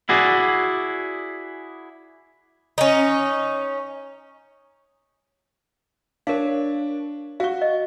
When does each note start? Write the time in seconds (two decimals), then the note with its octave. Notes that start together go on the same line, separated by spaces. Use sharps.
0.09 E4 F#4 G#4 D5
2.78 C#4 D#4
6.27 D4 A#4 C#5 F5
7.40 F#4 F5 C#6
7.62 D#5